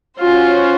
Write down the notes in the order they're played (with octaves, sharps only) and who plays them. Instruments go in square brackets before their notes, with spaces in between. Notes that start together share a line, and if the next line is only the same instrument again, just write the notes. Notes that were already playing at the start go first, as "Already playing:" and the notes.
[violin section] C#4 F#4 C5 [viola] F4